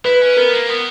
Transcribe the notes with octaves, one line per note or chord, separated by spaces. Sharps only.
E4 B4
C#4
B3 A#4
A#3
B3